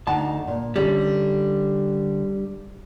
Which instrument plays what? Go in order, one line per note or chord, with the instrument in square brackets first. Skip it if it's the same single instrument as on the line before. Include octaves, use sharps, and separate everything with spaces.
[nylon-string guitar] D2 D#4 F#5 [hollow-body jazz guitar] A5
[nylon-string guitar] A#2
[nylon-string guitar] D3 C#4 A4 [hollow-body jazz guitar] G3